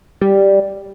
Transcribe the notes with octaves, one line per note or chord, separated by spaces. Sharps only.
G3